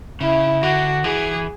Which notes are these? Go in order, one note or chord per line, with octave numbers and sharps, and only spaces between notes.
C#3 E4
D3 F#4
E3 G#4